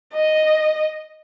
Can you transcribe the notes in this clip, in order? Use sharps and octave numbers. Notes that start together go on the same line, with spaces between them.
D#5